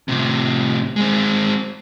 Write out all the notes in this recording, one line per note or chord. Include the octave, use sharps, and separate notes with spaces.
A2 C3
G#3 C4